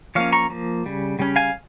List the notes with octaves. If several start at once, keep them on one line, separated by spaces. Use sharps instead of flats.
F3 A#3 C#4 C#5 F5
A#5 C#6
F3 A#3
C#3 G3
C#3 G3 C#4
F5 G#5